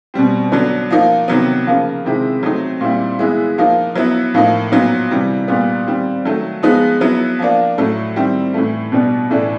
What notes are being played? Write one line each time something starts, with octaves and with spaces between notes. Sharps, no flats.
B2 G3 C4
D3 F#3 B3 D4
F3 A#3 D#4
C3 D#3 F#3 B3
C#3 F3 A#3
C3 D#3 G#3 C4 E4
F#3 A3 C4 D#4
A#2 G3 C4 E4
E3 G#3 B3 E4
F3 A#3 D#4
F#3 B3 E4
A2 F3 A#3 D#4
A#2 F#3 B3 D#4
C3 E3 G3
A#2 G3 B3
D#3 G3 C4
D#3 F#3 A3
F3 G#3 B3 D#4
F#3 B3 E4
F3 A#3 D4
A2 F#3 A3
D#3 G3 C4 E4
A2 E3 A3
B2 G3 B3 D4
A2 E3 A3 D4